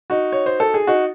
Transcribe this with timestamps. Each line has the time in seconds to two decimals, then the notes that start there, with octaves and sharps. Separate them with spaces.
0.10 D#4 F#4
0.32 C#5
0.46 C5
0.60 A4
0.74 G#4
0.87 D#4 F#4